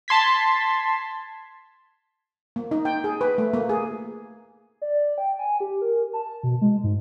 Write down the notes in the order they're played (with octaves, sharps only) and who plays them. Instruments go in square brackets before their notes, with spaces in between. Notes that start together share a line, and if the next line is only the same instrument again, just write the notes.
[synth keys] A5 C6 G#6 B6
[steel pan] A#3
D#4
G5
G#4
B4
A3
A#3
G#4
[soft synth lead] D5
G5
G#5
G4
A#4
A5
B2
G#3
G#2